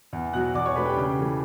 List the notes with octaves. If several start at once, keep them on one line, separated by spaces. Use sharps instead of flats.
E2
B2 F#3 F#5 F#6
E2 D5 D6
C#5 C#6
B2 A3 D4 B4 B5
G4 G5
C#3
E3 A3